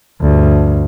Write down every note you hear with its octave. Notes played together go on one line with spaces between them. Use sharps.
D2 G2